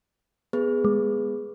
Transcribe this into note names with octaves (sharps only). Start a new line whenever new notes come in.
B3 G#4 B4
G#3